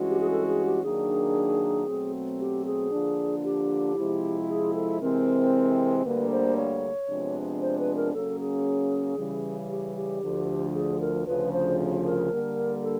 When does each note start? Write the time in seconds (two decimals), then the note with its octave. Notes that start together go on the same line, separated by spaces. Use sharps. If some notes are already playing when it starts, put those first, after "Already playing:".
Already playing: G2 E3 G#3 C#4 F#4
0.10 G4
0.20 G#4
0.31 A4
0.47 G#4
0.65 G4
0.83 D#3 F#3 A#3 D4 G#4
1.87 B2 F#3 A3 C4
2.39 G4
2.65 G#4
2.92 D3 F3 A#3 D4
3.44 G4
3.96 C3 F3 G#3 C4 E4
4.48 G#4
4.74 A4
5.00 C3 E3 G#3 C4 A#4
6.04 D2 D3 G3 A#3 B4
6.31 C5
6.57 C#5
7.09 C3 F3 G#3 B3 D4
7.61 C5
7.79 B4
7.96 A#4
8.13 C#3 F#3 A#3 C#4 A4
8.40 G#4
9.18 C#3 E3 G3
9.70 G4
9.96 G4
10.22 D2 D3 F3
10.74 G#4
11.01 A#4
11.26 D2 C#3 F3 B4
11.53 C5
12.05 A#4
12.32 D3 G3 A#3
12.83 A4